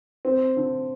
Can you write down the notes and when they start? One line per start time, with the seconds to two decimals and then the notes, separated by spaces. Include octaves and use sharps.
0.25 C4
0.57 D3